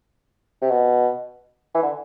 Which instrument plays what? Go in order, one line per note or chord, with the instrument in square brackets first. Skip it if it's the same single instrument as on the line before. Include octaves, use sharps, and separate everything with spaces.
[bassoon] C3
B2
E3
D3